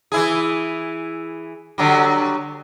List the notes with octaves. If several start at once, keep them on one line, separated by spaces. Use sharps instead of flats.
E3 E4 G#4
D3 F#3 G3